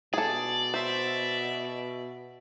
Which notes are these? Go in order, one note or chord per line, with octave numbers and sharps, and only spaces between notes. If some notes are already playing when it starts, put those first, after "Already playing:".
B2 G#4 A4 D5
C5 E5